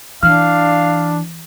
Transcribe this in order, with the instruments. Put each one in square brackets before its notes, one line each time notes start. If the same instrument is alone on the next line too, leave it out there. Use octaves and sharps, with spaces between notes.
[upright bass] E3 [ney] D4 [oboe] F5 [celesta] F6